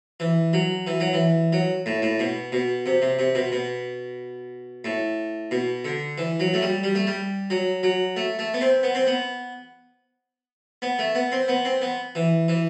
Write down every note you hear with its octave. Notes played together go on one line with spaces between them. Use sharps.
E3
F#3
E3
F#3
E3
F#3
A2
A2
B2
B2
C3
C3
C3
B2
B2
A2
B2
D3
E3
F#3
A3
G3
G3
A3
G3
F#3
F#3
A3
A3
B3
C4
B3
C4
B3
B3
A3
B3
C4
B3
C4
B3
E3
E3